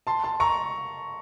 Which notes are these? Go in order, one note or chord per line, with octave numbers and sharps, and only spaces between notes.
A5 C6
A5 C6
A#5 C#6